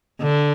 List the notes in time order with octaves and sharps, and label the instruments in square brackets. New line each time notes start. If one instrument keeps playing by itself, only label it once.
[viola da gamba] D3